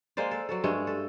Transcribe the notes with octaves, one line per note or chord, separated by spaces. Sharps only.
G#3 A#3 C5 D5
A4
F#3 F#4 A4
G2 G#3 A3 C#5
A4